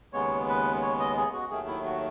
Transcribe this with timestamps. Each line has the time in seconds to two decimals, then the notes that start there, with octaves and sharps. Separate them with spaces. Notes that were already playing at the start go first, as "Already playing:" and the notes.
0.13 D#2 C#3 G#3 B3 C#5
0.48 B4
0.82 C#5
1.00 D#5
1.17 G#4
1.33 F#4
1.50 D#2 D#3 F#3 A3 G#4
1.67 E4
1.85 F#4